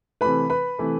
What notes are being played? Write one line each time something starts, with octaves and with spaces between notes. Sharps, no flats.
C3 E3 A3 B4 B5
B4 B5
C3 E3 A3